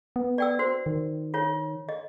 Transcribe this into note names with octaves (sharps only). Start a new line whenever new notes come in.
B3
D5 G5 E6
F#4 C5
D#3
F4 C#5
D#5